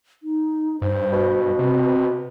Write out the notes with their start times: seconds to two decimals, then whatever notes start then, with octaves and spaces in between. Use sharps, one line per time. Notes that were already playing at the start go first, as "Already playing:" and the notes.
0.23 D#4
0.82 G2 C5
1.13 B2
1.59 C3 C4